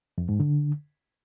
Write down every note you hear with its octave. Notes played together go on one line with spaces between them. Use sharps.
F2
G#2
D3